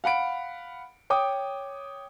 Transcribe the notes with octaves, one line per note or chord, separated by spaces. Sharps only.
F5 F#5 B5 D7
C#5 G5 D6 D#6